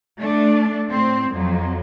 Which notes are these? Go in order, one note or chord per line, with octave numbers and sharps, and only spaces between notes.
A3 D4
A2 C4
F2 F#3